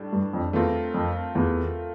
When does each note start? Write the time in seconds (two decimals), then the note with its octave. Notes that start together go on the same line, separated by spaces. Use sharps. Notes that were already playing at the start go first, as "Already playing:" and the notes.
Already playing: A2 G3 D4
0.13 G2
0.33 F2
0.53 E2 A3 C4 F4 A#4
0.94 F2
1.35 E2